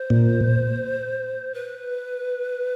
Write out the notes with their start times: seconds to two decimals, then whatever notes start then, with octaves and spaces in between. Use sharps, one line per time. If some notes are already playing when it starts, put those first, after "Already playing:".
Already playing: C5
0.10 A#2
1.54 B4